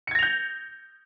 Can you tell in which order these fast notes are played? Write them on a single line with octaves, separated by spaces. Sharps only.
C#7 G#6 A#6 F7 G6